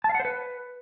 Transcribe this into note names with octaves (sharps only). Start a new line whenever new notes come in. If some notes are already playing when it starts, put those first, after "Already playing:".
A5
F5
F#5
C5
B4